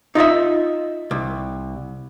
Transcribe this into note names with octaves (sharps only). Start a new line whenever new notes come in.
D#4 F4 D#5 E5
C2